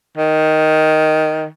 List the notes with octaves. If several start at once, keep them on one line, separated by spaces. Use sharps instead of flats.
D#3